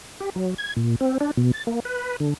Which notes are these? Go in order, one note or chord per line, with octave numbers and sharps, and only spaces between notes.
G4
F#3
G#6
A#2
C4
D4
B2
A6
A#3
B4
D3